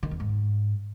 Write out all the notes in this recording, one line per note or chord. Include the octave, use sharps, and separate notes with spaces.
D#3
E2
G#2